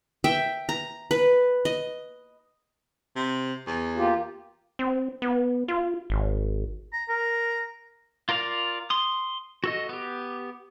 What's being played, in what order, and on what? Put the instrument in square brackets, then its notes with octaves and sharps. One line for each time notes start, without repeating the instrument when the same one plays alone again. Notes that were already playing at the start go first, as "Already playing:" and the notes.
[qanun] E5 G5
A#5
B4
D#5
[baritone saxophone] C3
E2
[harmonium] A#3 F4 G4
[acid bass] C4
B3
F4
G#1
[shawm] A#5
[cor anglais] A#4 [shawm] A#5
[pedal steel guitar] F4 A#4 D5 F5
C6 D#6
F#4 A4 D#5
B3 G4